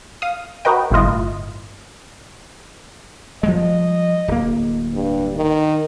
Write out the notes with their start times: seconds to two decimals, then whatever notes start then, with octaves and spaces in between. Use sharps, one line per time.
0.22 F5 D#6
0.65 F#4 A#4 B4 D#5 G5
0.91 G1 A2 E4 F4 D#5
3.43 F3 G3 G#3 D#5
4.28 D1 A#3
4.93 G2
5.36 D#3